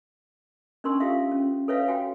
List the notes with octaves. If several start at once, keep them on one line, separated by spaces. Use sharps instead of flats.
C#4 D4 A#4 C6 C#6 E6
F4 G4 A4 A#4 E5 F5
C#4
A4 B4 C#5 E5 F5
F#4 G5 G#5